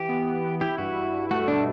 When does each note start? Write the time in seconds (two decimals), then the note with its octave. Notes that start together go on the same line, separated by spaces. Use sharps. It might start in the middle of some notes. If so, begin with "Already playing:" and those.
Already playing: E3 G4
0.09 B3
0.27 B3
0.44 B3
0.61 E4 G4
0.78 G2 F#4
0.95 G2
1.13 G2
1.31 A3 F#4
1.48 B2 D4